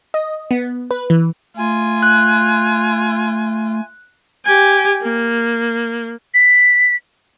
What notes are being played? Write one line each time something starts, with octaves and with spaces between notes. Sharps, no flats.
D#5
B3
B4
E3
A3 F4 G#5
F#6
G4 G#5
A#3
B6